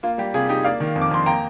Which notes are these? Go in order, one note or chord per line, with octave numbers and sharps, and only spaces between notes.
A#3 F4
G3 G4
C3 F4 G#4
D#4 G4
A#3 D5 F5
D#3
F2
D6
F2 C6
A#3 G5 A#5